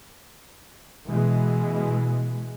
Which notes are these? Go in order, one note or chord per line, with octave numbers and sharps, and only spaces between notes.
B2 E3 G#3